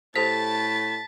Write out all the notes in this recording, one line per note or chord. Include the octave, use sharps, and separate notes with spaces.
A2 G4 A4 C5 A5 A6 B6